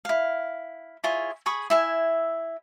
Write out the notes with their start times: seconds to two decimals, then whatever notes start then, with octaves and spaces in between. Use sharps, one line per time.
0.05 E4 F5
1.04 E4 F4 G#4 C#5
1.46 G#4 B5 C#6 D#6
1.70 E4 E5 G#5